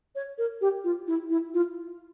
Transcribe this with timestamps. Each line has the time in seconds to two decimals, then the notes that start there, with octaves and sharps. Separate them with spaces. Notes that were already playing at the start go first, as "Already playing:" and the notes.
0.15 C#5
0.38 A#4
0.61 G4
0.84 F4
1.07 E4
1.30 E4
1.54 F4